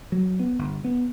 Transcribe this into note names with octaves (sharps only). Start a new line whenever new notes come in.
F#3
B3
G1
B3